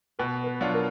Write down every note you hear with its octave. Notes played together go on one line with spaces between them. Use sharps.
B2 B4
B4
F#3 D4 F4
A#4